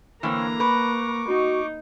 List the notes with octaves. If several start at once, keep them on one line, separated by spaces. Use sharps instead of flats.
D3 E3 A#3 C4 C#5 F5 A#5
B4 C#6 D6
D#4 F#4